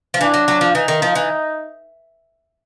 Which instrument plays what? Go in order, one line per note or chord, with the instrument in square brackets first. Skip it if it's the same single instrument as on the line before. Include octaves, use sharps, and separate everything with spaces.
[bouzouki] F3
[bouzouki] E3 [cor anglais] D4
[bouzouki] F#3
F#3
F3
[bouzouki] E3 [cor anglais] D#4
[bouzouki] D#3
F3
E3